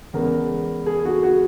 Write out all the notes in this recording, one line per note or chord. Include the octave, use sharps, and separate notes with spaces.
E2 C#3 G#3 B3 A#4
G#4
G#4
F#4
F#4